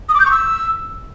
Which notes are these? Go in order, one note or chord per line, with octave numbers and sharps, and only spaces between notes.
D#6
D6
G6
C#6
E6